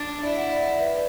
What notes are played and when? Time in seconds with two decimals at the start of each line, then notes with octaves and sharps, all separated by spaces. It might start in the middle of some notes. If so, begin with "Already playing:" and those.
Already playing: D4
0.23 E4 D5
0.37 F#5
0.52 D5
0.61 E5
0.66 D5
0.79 B4